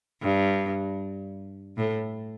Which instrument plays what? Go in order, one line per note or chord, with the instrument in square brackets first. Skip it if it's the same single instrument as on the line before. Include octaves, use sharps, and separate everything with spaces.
[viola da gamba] G2
A2